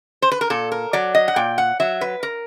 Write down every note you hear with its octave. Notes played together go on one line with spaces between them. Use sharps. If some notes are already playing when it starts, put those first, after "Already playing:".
C5
B4
A#4
A#2 A4
A#4
F#3 D5
D#5
F#5
A#2 G5
F#5
F#3 E5
B4
A#4